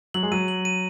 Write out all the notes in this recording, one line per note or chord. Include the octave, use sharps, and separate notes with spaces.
F#3 F#7
G#3
F#3 D#7
F#7
D#7